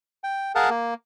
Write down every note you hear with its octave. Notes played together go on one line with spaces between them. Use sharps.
G5
G#4 A#4 F5 F#5 A5
A#3